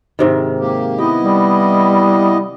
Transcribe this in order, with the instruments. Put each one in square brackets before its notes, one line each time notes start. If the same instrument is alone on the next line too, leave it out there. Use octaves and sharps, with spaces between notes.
[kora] G#2 C3 D#3
[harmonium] A#3 G4
[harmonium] B3 E4 D#5 [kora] G4
[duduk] G3